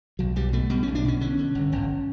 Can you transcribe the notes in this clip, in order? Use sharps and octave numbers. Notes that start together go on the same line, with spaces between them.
B1 F#3
B1 G3
B2 A3
B2 G3
B1 C#4
D4
B2 C#4
D3 C#4
D3
G1
G1